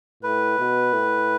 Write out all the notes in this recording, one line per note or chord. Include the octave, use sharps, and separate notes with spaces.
A2 B4
B2
A2